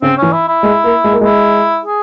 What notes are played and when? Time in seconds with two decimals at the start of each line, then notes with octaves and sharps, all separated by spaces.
0.02 C#3 C4
0.17 E3 C#4
0.32 E4
0.48 E4
0.63 G#3
0.84 A#3
1.04 G#3
1.12 A#3
1.21 G#3 E4
1.85 G#4